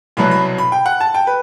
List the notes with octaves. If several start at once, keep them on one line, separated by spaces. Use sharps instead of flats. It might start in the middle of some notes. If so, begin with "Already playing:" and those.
C2 B2 F#3 B3 B5
B5
B5
G5
F#5
A5
G5
B4